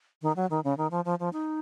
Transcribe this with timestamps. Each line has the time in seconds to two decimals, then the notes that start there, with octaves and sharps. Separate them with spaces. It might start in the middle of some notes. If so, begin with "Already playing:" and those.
0.22 D#3
0.36 F#3
0.51 D#3
0.64 C#3
0.78 D#3
0.91 F3
1.05 F3
1.20 F3
1.33 D#4